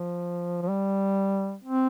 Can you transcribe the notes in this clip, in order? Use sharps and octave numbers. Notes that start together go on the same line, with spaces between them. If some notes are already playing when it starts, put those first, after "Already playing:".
Already playing: F3
F3
G3
C4